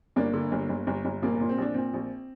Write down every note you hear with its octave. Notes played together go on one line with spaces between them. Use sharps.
G1 A#3 D4
D3
G1
G1
G1
G1
A#1 A#3
A#2
C4
A#1 D4
A#2 C4
A#1